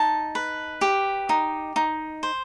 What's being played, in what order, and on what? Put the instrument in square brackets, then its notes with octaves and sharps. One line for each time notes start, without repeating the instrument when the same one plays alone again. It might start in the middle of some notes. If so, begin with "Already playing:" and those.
Already playing: [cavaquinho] D#4 A5
B4
G4
D#4
D#4
C5